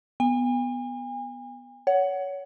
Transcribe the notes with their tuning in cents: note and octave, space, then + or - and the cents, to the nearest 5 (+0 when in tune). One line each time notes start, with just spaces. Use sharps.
B3 +0 G#5 -40
C#5 +25 F#5 +10